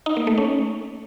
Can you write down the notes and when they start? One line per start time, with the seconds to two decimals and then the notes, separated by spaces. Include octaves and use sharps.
0.06 D#4
0.17 A#3
0.27 A3
0.38 C#4